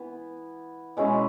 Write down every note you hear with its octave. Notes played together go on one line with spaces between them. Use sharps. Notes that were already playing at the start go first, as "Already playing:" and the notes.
Already playing: E3 B3 E4
B2 G#3 C#4 E4